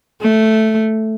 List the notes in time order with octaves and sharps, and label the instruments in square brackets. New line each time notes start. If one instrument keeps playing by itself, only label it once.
[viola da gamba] A3